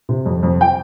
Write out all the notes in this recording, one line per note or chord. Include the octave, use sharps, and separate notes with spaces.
C3
F2
F2
G5